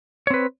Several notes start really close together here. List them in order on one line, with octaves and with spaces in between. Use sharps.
C#5 C4 B4